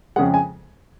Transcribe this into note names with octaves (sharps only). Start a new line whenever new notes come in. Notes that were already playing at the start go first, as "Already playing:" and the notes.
F2 C#3 G#3 F#5
G#5